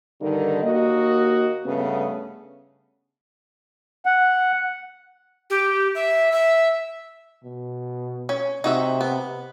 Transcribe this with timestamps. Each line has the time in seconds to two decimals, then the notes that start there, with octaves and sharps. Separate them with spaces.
0.21 G2 D3 D#3 D#4 A#4
0.62 D#2 A#3 F#4 D#5
1.65 G2 C#3 A3 B3
4.06 F#5
5.50 G4
5.95 E5
6.32 E5
7.44 B2
8.29 C#4
8.64 C3 D#4 F#4 E5
9.01 B3